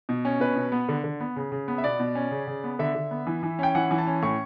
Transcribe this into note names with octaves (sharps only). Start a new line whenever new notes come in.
B2
C#4
B2 B4
B2
B3
D3
D3
B3
C#3
C#3
B3
E5
B2 D5
B2
C#4
C#3
C#3
B3
D3 E5
D3
B3
E3
E3
C#4 G5
E3 F#5
E3
A5
C#4
A2 C#6